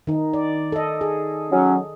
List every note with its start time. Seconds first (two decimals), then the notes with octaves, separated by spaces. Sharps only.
0.07 D#3 D#4
0.34 D5
0.72 A4 D#5
1.01 G#4
1.50 F#3 C#4